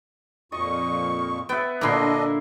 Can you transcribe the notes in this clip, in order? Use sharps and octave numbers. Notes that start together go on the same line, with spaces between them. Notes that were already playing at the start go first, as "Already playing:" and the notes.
F2 A#2 D#5 C#6
B3 E5 G5
A#2 D3 A#3 D4 E4 D#5 C6